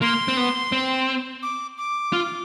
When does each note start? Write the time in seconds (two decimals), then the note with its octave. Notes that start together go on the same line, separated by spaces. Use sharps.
0.02 A#3 C6
0.28 C4
0.37 B3
0.72 C4
1.43 D6
1.77 D6
2.13 F4